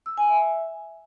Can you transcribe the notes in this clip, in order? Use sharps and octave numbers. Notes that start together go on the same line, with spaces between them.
E6
G#5
E5